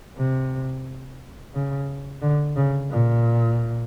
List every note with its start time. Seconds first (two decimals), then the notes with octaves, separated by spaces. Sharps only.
0.17 C3
1.54 C#3
2.22 D3
2.56 C#3
2.90 A#2